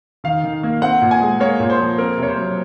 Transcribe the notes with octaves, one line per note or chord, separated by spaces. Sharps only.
D#3 F5
D#3
A#3
C4 F#5
A#2
G#5
G#3
A#3 C#5
A#2
C5
F3
C4 A#4
C3 C#5
C5
F#3